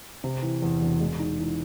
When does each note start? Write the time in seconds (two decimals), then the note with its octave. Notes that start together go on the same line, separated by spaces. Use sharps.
0.24 C3
0.43 E3
0.62 E2
0.81 E1
1.00 G#3
1.19 D#4
1.38 E3